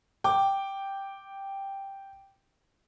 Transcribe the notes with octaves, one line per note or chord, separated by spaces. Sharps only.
G5 D6